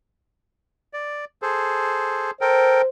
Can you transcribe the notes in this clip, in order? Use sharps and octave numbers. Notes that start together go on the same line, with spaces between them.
D5
G#4 A4 C5
A4 A#4 C5 G5